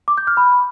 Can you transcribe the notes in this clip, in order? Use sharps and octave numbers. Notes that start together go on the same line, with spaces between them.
D6
G6
F6
B5